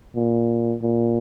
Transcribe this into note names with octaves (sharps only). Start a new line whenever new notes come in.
A#2
A#2